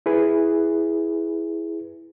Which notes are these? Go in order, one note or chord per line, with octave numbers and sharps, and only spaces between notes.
E4 G#4 B4